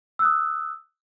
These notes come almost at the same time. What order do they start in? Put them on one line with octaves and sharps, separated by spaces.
E6 F#6 D#6